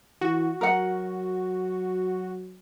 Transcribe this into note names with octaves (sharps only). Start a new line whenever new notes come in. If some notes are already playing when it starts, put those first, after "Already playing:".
E3 F#4
F#3 A#4 F#5